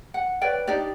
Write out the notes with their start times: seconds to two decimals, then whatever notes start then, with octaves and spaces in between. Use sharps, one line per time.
0.14 F#5
0.41 B4 C#5 D5 G5
0.67 D4 D#4 G4 D5